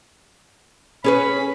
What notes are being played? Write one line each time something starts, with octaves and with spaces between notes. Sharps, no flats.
C#4 G#4 B4 B5